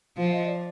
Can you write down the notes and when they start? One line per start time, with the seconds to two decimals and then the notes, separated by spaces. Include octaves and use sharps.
0.17 F3 F5
0.32 D#5
0.46 D5